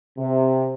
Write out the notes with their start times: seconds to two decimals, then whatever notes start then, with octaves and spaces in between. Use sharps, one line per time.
0.18 C3